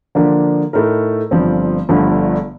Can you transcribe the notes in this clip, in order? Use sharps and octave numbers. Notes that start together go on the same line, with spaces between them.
D3 F3 A#3 D4
A2 A3 D#4 A#4
G1 G2 F3 C4
G1 G2 D3 F3 A3